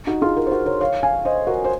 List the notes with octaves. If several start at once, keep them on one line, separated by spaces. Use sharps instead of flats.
D#4 F#4
F4 G#4
F#4 A#4
C5
F#4 A#4
A#4 C#5
C#5 F5
F5 G#5
C5 D#5
F#4 A#4
C5